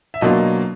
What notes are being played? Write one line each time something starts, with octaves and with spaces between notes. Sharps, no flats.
E5
B2 F#3 A#3 D4 F4 D#5